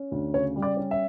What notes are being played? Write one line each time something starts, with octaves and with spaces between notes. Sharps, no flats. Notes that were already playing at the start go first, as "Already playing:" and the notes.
Already playing: C#4
D2
C#3 C#5
G3
D5
C#4
E5